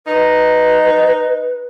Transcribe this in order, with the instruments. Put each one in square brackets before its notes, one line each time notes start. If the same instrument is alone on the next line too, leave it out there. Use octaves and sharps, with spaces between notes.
[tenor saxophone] D#4 [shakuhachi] B4